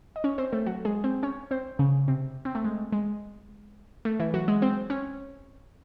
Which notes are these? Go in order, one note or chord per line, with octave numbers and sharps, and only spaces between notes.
D#5
C#4 C#5
C4 C5
A3 A4
F#3 F#4
G#3 G#4
C4 C5
C#4 C#5
C4 C5
C#3 C#4
C3 C4
C4
A3
G#3
G#3
A3
E3 E4
F#3 F#4
G#3 G#4
C4 C5
C#4 C#5